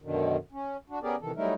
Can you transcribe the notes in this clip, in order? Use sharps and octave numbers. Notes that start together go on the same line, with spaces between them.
F#2 B2 D3 D#3
C#4
D4 F#4
B3 C#4 G4 G#4 A#4 D5
C3 D#3 E3 A4
F#3 G3 A3 D#4 E4 A#4